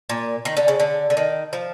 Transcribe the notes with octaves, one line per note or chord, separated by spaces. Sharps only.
A#2
D#3
D3
C#3
D3
D3
D#3
F3